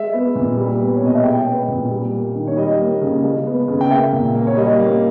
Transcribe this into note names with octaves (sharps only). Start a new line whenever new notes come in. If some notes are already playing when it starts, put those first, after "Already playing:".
Already playing: G#3 E5
B3
A#2
G3
B3
C#5
B2 D#5
E5
G#3 G5
B3
A#2
G3
A#3
D#3
C#5
G3 D#5
A#3
C#3
G#3
B3
C#3
G5
A#3 E5
A#2
A#3
C#5
G3 D#5
A#3